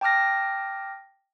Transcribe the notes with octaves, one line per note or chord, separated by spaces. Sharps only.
G5 A5 D6 F6 A#6